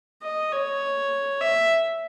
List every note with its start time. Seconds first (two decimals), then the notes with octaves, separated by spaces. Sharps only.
0.22 D#5
0.52 C#5
1.41 E5